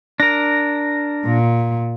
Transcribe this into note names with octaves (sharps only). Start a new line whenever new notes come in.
D4 A#4 A#6
A#2